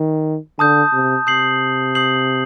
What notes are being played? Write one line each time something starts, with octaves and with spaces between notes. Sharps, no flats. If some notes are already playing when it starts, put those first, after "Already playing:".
Already playing: D#3
D3 A5 D#6 G6
C3
C3 D#6 G6 C7 F#7
D#6 G6 C7 F#7